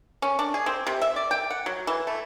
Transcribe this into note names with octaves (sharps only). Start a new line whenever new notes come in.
C#4
D4
G#4
C4
C3
E5
D5
G5
F#5
F#3
E3
A3